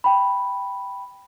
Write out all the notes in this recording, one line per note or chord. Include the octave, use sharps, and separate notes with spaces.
G5 B5